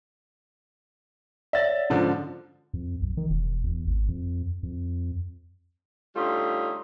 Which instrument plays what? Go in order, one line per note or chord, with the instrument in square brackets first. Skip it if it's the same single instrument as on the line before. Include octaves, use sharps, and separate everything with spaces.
[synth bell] C#5 D5 [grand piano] E5 A6
[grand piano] G#2 D3 F3 [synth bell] C#4
[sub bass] F2
B1
D#3
E1
E2
G#1
F2
F2
[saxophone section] D3 G3 A3 C#4 D#4 F4